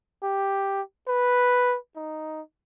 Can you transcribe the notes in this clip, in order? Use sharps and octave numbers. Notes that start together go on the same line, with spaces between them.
G4
B4
D#4